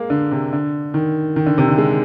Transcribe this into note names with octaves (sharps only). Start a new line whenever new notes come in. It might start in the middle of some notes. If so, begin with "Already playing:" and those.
Already playing: G#3 A#3
D3
C3
D3
D#3
D#3
D3
C3
D3
G#3